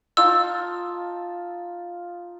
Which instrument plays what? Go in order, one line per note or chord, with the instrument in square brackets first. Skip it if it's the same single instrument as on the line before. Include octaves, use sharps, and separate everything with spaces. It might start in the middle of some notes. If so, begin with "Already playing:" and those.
[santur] D#4 F4 A5 [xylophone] E6